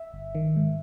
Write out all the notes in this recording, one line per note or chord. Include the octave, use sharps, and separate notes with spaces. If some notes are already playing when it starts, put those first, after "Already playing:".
Already playing: E5
G1
D#3
G#2